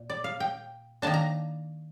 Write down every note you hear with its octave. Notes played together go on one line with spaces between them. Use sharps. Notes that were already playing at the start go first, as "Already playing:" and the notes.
Already playing: A#2
D5
F5
G5
D#3 A#3 D4 A5
A#5